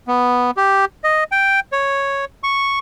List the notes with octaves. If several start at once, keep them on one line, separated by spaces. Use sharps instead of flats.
B3
G4
D#5
G5
C#5
C#6